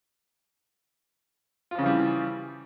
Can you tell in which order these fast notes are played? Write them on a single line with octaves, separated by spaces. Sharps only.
F4 F3 C#3 E3 G3